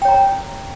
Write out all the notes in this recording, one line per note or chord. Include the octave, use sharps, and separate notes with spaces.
C#5 G5 A#5